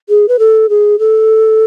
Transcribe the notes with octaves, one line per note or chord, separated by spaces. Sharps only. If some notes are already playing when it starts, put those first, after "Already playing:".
G#4
B4
A4
G#4
A4